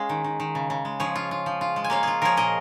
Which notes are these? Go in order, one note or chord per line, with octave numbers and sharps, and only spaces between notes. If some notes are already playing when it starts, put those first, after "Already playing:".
Already playing: G#3 C#4 G#4 F5 G#5
D#3
D#3
D#3
C#3
C#3
G#3
F3 G#4 C#5
F4
F4
F3
F4
G#3
G#5
A#3 C#5 F5
F4 G#4
F3 G#4 A#4 C#5
A#2 A#4 D#5